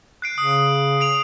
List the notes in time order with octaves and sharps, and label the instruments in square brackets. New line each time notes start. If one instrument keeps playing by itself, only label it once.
[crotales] F#6 C7 D7
[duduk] C#3 [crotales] D#6
[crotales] C7 D7 F7